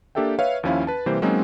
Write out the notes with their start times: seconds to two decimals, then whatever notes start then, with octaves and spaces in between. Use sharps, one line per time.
0.15 A#3 D4 G4 A4 E5 G5
0.39 B4 C#5 E5 F5
0.63 D#2 F3 C#4 E4 F5
0.87 B4 A5
1.06 C3 E3 G3 A#3 G4 C5
1.22 F#3 G#3 A#3 C4 C#4 D#4